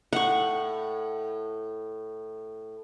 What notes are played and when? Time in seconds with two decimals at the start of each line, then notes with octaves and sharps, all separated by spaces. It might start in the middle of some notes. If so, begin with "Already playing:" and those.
0.13 A2 F#5 C#6